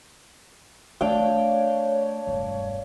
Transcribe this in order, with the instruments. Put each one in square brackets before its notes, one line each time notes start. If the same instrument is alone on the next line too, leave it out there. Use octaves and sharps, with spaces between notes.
[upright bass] A3 [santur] D4 F5 G5 [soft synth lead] C#5
[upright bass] E1 G2